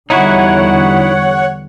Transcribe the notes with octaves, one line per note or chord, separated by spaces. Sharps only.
E2 D3 G3 D#4 E4 F#4 C#5 F#5